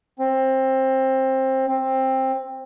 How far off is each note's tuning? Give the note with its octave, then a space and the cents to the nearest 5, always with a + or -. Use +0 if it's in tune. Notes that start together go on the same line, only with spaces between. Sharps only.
C4 +20
C4 +15